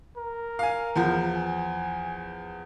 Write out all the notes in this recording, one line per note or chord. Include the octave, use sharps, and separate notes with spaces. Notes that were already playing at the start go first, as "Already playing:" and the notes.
A#4
F5 G#5
E2 F3
G#5